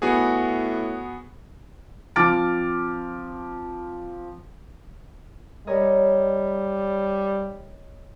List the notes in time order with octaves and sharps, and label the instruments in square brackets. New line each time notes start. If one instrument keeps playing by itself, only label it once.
[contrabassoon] A2 [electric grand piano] B3 F#4 G#4
[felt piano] F3 C4 D6 F6 A6 D7
[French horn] G3 [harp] A#4 C#5 D#5